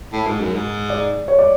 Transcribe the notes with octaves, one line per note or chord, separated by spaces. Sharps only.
A2
G#2
F#2
G#2
D5
C#5
D5